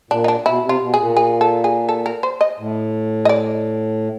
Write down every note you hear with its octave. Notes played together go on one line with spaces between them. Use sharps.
A#2 D4
D#4
D4
B2 E4
C3
F4
B2
G#4
A#2
G#4
A4
G#4
A4
A#4
C5
D#5
A2
D#5
D5